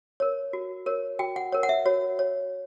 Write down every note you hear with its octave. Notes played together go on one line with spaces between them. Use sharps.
A#4 C#5
F#4
A#4 C#5
F#4 G5
F#5
A#4 C#5
F#5
E5
F#4 C#5
C#5